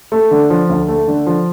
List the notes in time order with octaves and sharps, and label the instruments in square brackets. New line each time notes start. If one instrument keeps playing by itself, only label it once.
[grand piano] A3
D3
F3
D2
A3
D3
F3